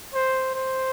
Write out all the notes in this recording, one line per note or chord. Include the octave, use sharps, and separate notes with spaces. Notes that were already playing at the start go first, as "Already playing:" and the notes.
C5
C5